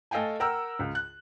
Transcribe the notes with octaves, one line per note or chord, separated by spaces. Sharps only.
A3 A4 D#5 F5 G5 G#5
A#4 F#5 G5 A#5 E6
C#2
F#6